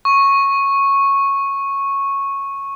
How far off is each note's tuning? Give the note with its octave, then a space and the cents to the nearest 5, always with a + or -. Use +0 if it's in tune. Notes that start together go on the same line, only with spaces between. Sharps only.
C#6 -10